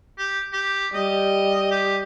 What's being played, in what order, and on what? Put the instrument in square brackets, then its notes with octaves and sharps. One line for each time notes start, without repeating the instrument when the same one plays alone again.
[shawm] G4
G4
[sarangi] G3 [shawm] D#5
[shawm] G4